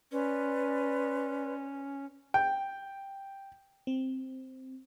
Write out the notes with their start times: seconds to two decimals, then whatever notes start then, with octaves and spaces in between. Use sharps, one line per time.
0.12 C#4 B4 D5 C6
2.34 G5
3.87 C4